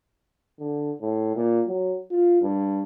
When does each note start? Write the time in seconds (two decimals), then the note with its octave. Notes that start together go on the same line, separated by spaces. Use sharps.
0.59 D3
1.01 A2
1.36 A#2
1.67 F#3
2.11 F4
2.42 G2